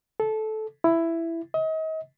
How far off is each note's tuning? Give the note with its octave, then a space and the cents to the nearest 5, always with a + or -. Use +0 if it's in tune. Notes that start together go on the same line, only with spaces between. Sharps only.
A4 -15
E4 +10
D#5 +35